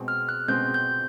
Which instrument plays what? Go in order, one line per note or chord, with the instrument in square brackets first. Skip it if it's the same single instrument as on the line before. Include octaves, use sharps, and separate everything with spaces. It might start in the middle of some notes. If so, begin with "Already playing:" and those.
Already playing: [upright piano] B2 G#3 C4
[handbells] F6
F#6
[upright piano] B2 G#3 C4 [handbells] G6
[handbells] G6